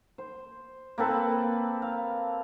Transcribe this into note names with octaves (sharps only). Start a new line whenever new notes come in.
C5
A#3 C4 A4 B4
F5